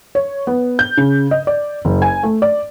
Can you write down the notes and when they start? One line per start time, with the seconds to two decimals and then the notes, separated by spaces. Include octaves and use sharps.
0.15 C#5
0.47 B3
0.79 G6
0.97 C#3
1.31 D#5
1.47 D5
1.85 F#1
2.02 G#5
2.23 A3
2.42 D5